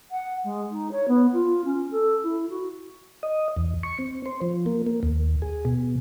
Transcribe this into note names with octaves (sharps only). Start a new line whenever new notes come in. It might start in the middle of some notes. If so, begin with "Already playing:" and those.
F#5
G#3
D#4
C#5
B3
F4
C#4
A4
E4
F#4
D#5
E2
C#6
C4
C5
F3
A#3
A#3
D#2
G#4
B2